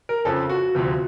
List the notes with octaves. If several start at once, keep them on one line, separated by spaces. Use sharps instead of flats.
A#4
F2 C#3 F3 A4
F#4
D2 C3 F3